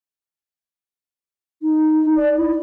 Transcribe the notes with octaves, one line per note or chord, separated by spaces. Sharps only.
D#4
D5
E4